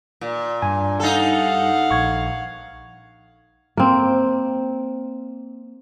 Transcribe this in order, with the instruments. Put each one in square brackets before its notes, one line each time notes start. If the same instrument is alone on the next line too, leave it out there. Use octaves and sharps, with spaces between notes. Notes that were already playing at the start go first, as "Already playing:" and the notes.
[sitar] A#2
[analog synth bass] G2 [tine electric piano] G#5
[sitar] D#4 A4 [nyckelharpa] F5 F#5
[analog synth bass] A#1 [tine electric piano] C#6 G#6
[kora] A#3 C4